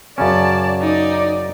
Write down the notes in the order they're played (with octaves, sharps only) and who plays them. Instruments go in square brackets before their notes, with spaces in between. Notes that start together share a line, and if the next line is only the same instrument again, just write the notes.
[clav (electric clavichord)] F#2 C#3 C#4 [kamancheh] D5 A5
[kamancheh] D#4 D5